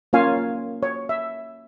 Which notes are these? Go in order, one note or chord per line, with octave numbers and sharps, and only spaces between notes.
A#3 C#4 F4 C#5 F5 G#5
C#5
E5